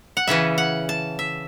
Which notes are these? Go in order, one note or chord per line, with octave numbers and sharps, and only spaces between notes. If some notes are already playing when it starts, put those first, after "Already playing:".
F#5
C#3 E3 C#4 E5
F#5
A5
E5